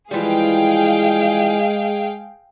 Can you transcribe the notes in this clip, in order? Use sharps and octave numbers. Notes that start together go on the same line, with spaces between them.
E3 F3 G3 G#3 G#4 F5 G5